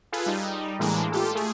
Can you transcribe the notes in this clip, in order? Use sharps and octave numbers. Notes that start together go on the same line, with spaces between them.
F4 G#4 A4 B4
G3 D#4
A2 E3 G#3 A#3 D4
F4 G4 A4
A3 G#4